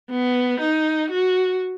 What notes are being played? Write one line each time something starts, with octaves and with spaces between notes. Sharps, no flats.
B3
D#4
F#4